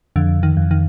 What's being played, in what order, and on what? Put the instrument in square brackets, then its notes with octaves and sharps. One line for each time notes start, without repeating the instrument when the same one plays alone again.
[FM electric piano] F2 [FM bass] D3
[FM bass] D#3
[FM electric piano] F2
[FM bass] D#3